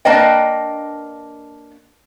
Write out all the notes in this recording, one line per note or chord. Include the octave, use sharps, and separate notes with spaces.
A#3 D4 B4 D#5 G5